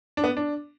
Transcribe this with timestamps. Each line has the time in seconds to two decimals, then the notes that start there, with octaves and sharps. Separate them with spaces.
0.17 D4
0.24 B3
0.37 D4